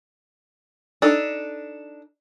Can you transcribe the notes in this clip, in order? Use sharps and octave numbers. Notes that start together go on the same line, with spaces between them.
D4 D#4 A4